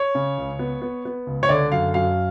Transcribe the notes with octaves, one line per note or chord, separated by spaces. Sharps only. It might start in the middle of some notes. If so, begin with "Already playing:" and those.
Already playing: C#5
C#3
C#2
B3
B3
B3
C#2
C#5
D3 D5
F#2 F5
F#2 F5